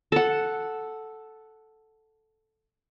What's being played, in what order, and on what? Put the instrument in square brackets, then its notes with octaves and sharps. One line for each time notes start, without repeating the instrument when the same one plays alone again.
[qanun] A4 F#5